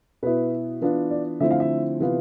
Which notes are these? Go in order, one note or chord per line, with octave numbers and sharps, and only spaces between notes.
B2 B3 E4 B4
E3 B3 D4 F4
D5
D3 F3 A3 C4 E4 E5
F5
E5
C3 E3 B3 F4